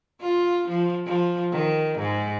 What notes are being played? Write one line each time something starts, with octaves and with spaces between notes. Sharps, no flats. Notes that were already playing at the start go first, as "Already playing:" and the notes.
F4
F3
F3
D#3
G#2